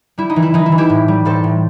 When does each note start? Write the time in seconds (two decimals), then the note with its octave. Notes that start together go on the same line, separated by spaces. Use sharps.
0.18 G3 E4
0.30 D#4
0.36 E3
0.43 E4
0.54 E3 D#4
0.66 E4
0.72 E3
0.78 E4 G4
0.90 A2
1.08 G3
1.25 A2 A4 C5
1.44 A2